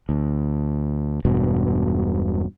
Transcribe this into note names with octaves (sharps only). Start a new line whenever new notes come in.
D2
E1 G2 B2